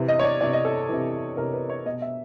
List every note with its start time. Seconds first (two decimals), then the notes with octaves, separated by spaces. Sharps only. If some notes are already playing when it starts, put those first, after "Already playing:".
Already playing: C3 E3
0.08 D#5
0.19 C#5
0.24 D5
0.41 C3 E3 D5
0.53 D#5
0.65 A4
0.89 C3 E3
1.37 C3 E3 A#4
1.53 B4
1.69 C#5
1.85 B2 D#5
2.02 E5